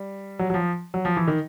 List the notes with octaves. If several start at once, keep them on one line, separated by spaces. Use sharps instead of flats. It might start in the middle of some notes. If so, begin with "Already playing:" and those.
Already playing: G3
F#3
F#3
F3
F#3
F3
E3
D#3